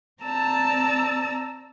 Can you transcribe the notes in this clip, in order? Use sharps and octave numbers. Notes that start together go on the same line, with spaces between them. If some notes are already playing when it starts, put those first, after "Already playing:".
C4 D5 A5 A#5 E6